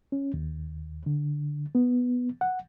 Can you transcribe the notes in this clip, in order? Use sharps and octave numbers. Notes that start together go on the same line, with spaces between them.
C#4
D#2
D3
B3
F#5